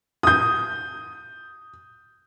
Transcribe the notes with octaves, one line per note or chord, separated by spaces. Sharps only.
D#6 G6